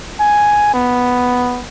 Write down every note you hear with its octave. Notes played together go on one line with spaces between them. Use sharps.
G#5
B3